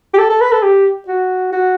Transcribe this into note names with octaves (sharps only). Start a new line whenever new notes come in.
G4
A4
A4
B4
A4
G4
F#4
F#4